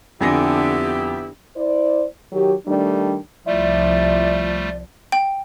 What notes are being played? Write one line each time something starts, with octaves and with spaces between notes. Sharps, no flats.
F2 D3 B3 E4 G4 G#5 A#6
E4 C5 D5
D#3 F#3 G4
D#3 G3 A3 D4
C2 F3 G3 A3 E4 F4 D5
G5